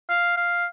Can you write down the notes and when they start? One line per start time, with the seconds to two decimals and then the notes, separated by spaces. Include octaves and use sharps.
0.09 F5
0.37 F5